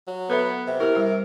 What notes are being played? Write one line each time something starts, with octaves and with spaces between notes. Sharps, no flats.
F#3
B3 A4 B4 E5
C3
E4 G4 A#4
G3 E5